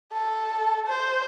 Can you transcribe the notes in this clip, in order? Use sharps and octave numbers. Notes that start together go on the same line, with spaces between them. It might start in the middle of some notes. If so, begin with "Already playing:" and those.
A4
C5